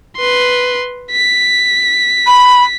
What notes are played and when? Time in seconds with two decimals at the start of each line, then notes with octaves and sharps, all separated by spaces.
0.17 B4 C6
1.11 B6
2.26 B5